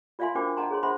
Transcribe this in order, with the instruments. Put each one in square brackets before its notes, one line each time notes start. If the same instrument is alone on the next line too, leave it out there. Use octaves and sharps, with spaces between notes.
[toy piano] F4 D5 E5 F5 G#5 C6
D4 F#4 A#4 C5 G5 D6
D4 D#5 F#5 A5 A#5 C6
G#4 C#5 C6
D4 C5 E5 F#5 B5 C6